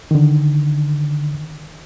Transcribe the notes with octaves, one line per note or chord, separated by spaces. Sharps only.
D3 D#3